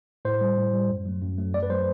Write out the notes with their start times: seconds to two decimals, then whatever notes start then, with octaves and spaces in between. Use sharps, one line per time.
0.25 A2 C5
0.41 G3
0.58 A2
0.74 G3
0.90 F#2
1.06 F#3 A3
1.22 F#2
1.38 F#3 A3
1.54 F#2 D5
1.63 B4
1.70 F#3 A3 C5